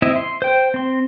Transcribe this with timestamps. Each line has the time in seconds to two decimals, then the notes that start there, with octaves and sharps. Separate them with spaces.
0.02 C4 E4 D#5 E5
0.16 C6
0.42 C5 G5
0.74 C4 C6